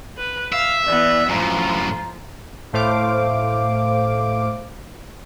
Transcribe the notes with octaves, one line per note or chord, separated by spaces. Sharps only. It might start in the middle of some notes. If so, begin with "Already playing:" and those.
B4
E5 F5
E3 B3 D5
F#2 A2 F3 F4 A#5
A2 A3 C5 F5 D6